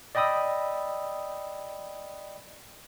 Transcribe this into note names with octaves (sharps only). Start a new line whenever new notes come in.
D5 D#5 G5 B5 D#6 E6